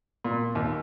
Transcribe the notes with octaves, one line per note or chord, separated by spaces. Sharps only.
A#2
D#2